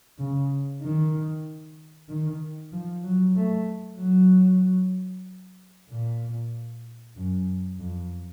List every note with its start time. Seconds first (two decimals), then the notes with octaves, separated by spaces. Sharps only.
0.19 C#3
0.82 D#3
2.09 D#3
2.72 F3
3.04 F#3
3.36 A3
3.99 F#3
5.89 A#2
7.16 F#2
7.80 F2